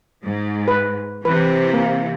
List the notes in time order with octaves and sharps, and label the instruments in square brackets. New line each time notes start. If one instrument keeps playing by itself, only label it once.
[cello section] G#2
[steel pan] B4
[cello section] C3 E3 [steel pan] B4
[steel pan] A#3